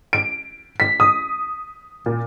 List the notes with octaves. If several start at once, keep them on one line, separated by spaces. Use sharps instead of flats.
D7
B6
D#6
A#2